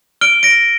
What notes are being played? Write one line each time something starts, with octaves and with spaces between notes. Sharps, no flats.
F6 D7 G7
A#6 D7